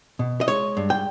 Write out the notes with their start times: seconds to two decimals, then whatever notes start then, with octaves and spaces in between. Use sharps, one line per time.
0.19 B2
0.41 D#5
0.48 G#3 C#5
0.77 G2
0.90 G5